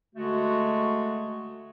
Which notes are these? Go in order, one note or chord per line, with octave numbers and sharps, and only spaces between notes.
D3 G#3 A3 F#4